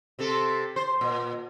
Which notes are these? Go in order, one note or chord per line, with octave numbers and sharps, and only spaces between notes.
C3 C4 A4
C5
A#2